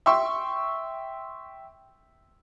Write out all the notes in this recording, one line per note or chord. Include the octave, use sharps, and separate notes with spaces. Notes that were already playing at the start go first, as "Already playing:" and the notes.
E5 G5 C6 C#6 E6